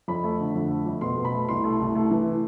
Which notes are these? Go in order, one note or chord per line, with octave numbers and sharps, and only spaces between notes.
F2 B5
A3
D3
F2
A3
F2
B2 C6
B2
B5
A3
C2 C6
A3
C2
A3
E3